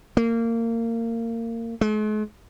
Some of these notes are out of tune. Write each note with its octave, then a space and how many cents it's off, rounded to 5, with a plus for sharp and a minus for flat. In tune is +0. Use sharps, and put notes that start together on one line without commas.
A#3 -25
G#3 +45